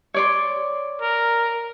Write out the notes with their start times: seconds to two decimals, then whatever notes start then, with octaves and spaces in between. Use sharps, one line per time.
0.14 C#5 D5 C6
1.02 A#4